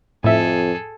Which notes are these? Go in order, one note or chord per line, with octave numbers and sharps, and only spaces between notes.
F2 A2 G#4 A4 E5